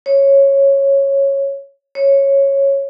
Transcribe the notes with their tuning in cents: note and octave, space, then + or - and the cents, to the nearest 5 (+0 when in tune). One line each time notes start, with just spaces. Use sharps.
C#5 -10
C#5 -10